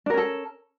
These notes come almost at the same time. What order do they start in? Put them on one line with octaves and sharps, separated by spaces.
D4 A#4 C#4 A4